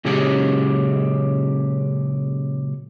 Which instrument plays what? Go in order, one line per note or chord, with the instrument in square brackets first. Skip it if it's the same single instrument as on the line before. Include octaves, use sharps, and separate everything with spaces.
[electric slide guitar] A#2 C#3 F#3 G#3 C#4 G4